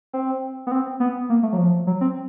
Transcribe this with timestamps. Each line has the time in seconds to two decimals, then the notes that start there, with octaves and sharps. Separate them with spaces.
0.13 C4
0.67 B3
0.71 C4
1.00 B3
1.30 A#3
1.43 A3
1.53 F#3
1.58 F3
1.87 F#3
2.01 C4